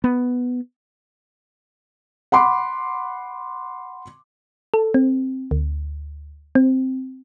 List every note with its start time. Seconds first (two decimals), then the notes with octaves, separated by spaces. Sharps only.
0.04 B3
2.32 F#5 B5 C6 D6
4.74 A4
4.94 C4
5.51 D2
6.55 C4